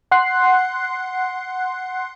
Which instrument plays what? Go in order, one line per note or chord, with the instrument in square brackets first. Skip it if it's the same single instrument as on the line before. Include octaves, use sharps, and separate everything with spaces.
[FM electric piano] F#5 C6 F#6 C7